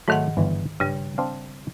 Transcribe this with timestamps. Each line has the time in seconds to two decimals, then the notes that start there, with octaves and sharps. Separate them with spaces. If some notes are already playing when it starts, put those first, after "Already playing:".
0.08 G#2 D#3 F#3 A3 F#5
0.37 G1 E3
0.80 G2 C#3 G3
1.18 C4 D4 F5